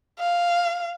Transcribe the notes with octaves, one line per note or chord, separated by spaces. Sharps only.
F5